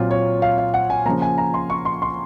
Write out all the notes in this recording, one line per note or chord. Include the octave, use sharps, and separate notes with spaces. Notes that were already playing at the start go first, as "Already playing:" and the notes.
Already playing: A#2 F#3 C4 F4
C#5
F5
F5
F#5
G#5
C#3 F3 A#3 A#5
G#5
A#5
C6
C#6
C6
C6